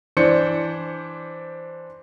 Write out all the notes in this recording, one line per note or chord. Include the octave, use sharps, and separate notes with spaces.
E3 D4 C5 D5 C#7